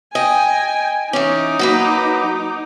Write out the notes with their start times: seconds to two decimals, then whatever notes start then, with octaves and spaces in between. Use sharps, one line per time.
0.15 D#5 G5 G#5
1.13 E3 C#4 D#4 D6
1.59 F#3 A#3 B4